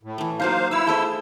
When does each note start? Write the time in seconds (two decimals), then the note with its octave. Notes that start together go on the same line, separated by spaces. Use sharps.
0.03 A2
0.18 E3 A3
0.40 F#3 A#3 D#4 C5 F5
0.71 E4 B4 F5 E6
0.87 A3 G#4 C5